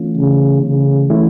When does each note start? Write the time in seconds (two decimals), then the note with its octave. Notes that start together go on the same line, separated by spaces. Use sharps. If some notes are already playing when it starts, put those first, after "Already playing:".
Already playing: E3 A3 C#4 F4
0.17 C#3
0.64 C#3
1.10 E3 A3 C#4 E4